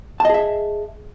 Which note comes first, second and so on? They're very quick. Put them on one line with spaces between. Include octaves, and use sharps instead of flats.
A5 D#5 G#4 E5